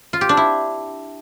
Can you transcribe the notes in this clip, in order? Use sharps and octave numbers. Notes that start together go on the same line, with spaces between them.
F4
G4
D4
E4